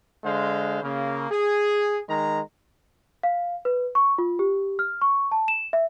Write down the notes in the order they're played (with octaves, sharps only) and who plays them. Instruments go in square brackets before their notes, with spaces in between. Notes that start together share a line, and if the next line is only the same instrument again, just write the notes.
[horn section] D3 G#3 C5 F5
C#3 A#3
G#4
D#3 G#3 A#5
[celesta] F5
B4
C#6
F4
G4
F6
C#6
A5
E7
E5